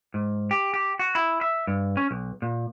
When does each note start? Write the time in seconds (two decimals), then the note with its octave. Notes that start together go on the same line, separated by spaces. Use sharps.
0.14 G#2
0.51 G4
0.74 G4
0.99 F#4
1.15 E4
1.41 E5
1.67 G2
1.97 C#4
2.11 B1
2.42 A#2